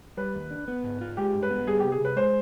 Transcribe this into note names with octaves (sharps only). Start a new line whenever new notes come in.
G3 B4
D#2
D4
B3
G#2
F4
G#3 G4
G2
B4
B3
G3 G#4
C2 G4
G#4
C2 B4
G#3 C5